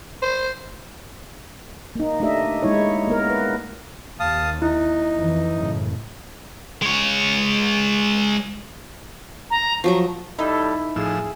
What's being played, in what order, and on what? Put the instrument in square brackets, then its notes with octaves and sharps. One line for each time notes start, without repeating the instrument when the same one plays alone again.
[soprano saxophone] C5
[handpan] A#3 D#4
A3 D4 D#4 G4 D#5 E5
G#3 A#3 D#4 E4 C#5
A#3 B3 A#4
B4
[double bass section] D#2 [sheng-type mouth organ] F5 A5 D#6
[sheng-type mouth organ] D#4 [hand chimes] E4
[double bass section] F2 E3
F#2 A2 C#3
[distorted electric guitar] G#3 C#5
[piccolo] A#5
[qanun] F3 F#3 A#5 [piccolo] C#6
[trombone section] G3 A4 [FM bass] D#4 [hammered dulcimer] E4
[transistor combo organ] A2 F3 E6 [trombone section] G#4